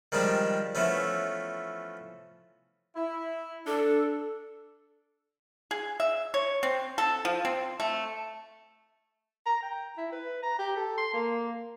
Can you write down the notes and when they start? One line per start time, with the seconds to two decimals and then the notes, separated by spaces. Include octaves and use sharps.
0.12 D#3 F3 G3 G#3 D4 G4
0.75 E3 F3 A3 B3 C#4
2.96 E4
3.67 D4 A4
5.71 G#4
6.00 E5
6.34 C#5
6.63 C4
6.98 A4
7.25 F3
7.45 C4
7.80 A3
9.46 A#5
9.62 G5
9.97 E4
10.12 B4
10.43 A#5
10.59 G4
10.76 A4
10.97 C6
11.13 A#3